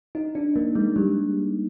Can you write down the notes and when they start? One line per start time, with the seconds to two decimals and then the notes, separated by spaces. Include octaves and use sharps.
0.15 D#4
0.35 D4
0.56 A#3
0.75 G#3
0.96 G3